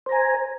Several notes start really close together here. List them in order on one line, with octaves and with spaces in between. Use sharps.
C5 A#5 G#5